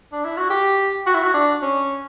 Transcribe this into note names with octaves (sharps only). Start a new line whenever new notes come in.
D4
E4
F#4
G4
F#4
E4
F#4
D4
C#4